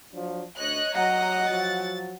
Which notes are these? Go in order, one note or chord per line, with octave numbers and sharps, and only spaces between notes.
F3 F#3 D4
D2 C#5 D#5 F#6
F#3 D#5 F#5 A#5
F3 F#3 A6